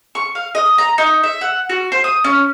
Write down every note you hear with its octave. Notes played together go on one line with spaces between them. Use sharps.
C#6
F5
D#5
A#5
D#4
E5
F#5
F#4
C5
D#6
C#4